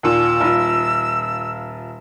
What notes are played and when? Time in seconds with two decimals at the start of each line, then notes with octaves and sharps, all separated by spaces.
0.03 D#2 A#2 E6
0.40 D#1 F4